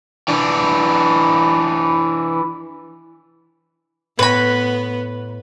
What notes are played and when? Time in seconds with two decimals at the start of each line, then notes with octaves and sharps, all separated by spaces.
0.28 E3 D4
4.19 A2 B3 B4 C#5 B5 A#6